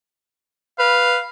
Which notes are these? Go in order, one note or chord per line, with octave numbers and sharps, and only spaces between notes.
B4 F5